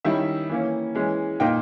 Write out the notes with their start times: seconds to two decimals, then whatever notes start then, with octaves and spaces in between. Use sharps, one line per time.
0.05 D#3 G3 C#4 E4 E5
0.50 E3 A#3 C#4
0.95 E3 G#3 C#4
1.40 A#2 A#3 D#4 G5